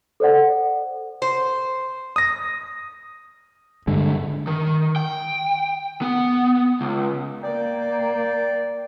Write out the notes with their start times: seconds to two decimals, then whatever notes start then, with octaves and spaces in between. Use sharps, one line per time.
0.20 A4 C5 D5 F#5
1.22 C5
2.16 D#6 A#6
3.87 G2 D3 G#3
4.47 D#3
4.96 G5
6.02 B3
6.81 C#2
7.43 A#3 D5 G5